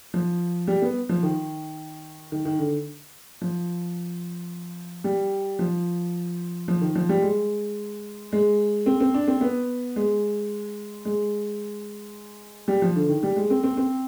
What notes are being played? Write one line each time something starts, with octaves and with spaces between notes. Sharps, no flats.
F3
G3
B3
F3
D#3
D#3
D#3
D3
F3
G3
F3
F3
D#3
F3
G3
G#3
G#3
C4
C4
D4
C4
B3
G#3
G#3
G3
F3
D3
D#3
G3
G#3
C4
C4
C4